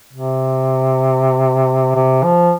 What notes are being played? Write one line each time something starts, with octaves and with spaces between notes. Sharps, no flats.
C3
C3
F3